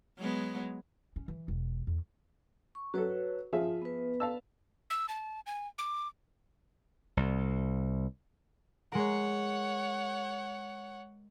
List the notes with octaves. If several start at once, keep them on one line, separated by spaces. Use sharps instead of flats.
F#3 G#3 B3
C#4
E3
E1
E2
C#6
F#3 F#4 A4 B4 C#5
F3 F4 G#4 E5
B3 B4
F5 A5 E6
E6
A5
G#5
D6
C2
G#3 A#4 C#5 F#5